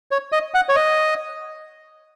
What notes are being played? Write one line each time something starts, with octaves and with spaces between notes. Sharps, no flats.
C#5
D#5
F#5
C#5
D#5